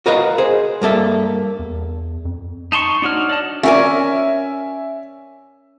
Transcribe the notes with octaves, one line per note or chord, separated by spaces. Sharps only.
F#4 A#4 B4 D#5 F5
G#4 C5
G2 A#3 A4 E5
E2
F2
D#4 A5 C6 C#6
D4 D#4 F#4 C#5 F6
D5 D#5 A5
C#4 A#4 D5 E5 G#5